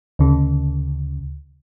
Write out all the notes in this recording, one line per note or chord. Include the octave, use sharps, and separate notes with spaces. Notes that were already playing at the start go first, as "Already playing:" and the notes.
D2 C#3